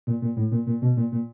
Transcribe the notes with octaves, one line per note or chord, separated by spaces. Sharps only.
A#2
A#2
A2
A#2
A#2
B2
A#2
A#2